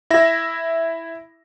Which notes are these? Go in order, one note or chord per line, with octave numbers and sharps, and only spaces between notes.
E4 E5 A#6